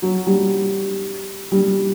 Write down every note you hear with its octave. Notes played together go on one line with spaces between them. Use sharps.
F#3
G3
G3